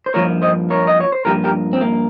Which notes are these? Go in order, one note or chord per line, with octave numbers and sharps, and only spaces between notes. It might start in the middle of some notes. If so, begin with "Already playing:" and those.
C5
G2 F3 A#3 A#4 C#5
C5 D#5
A#4 C#5
D#5
C#5
C5
G2 F3 A#3 G4 A#4
G4 A#4
C4
A#3